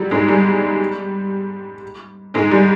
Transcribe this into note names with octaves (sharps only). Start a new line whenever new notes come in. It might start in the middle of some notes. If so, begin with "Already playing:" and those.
Already playing: F#3 G3
G#2 G#3
G3
G#2 G#3
G3